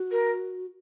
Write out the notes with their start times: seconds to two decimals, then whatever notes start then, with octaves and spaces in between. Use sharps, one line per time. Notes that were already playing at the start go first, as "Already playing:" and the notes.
Already playing: F#4
0.11 A#4